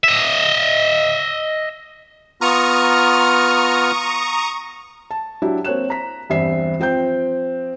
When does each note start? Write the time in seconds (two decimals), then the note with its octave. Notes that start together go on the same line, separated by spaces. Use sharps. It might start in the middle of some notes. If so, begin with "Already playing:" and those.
0.04 D#5 E5
2.41 B3 F4 A#5 C#6 D#6 F6
5.11 A5
5.42 F#3 D4 E4 G4 E5
5.65 A#3 C4 C#5 F#6 E7
5.90 A#5 B6
6.30 E2 G2 C4 E5 C7
6.79 F3 C4 G5 G6